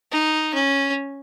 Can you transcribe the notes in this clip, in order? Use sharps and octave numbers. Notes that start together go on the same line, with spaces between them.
D#4
C#4